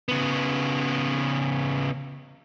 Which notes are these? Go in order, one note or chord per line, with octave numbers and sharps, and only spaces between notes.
C#3 B3